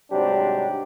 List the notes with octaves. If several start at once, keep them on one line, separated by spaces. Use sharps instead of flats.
G#2 C3 F#3 G3 D4 G4